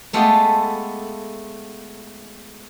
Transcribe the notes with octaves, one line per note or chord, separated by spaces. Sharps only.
G#3 A3 B3 F4 G4 A4